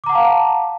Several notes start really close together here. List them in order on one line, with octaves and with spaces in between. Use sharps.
D6 A#5 F#5 A5 F5